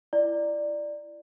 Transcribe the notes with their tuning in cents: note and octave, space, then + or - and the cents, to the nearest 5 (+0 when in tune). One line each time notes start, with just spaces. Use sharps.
E4 +25 D5 +10